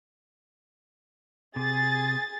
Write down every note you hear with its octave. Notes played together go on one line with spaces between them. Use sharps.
C3 G#4 A6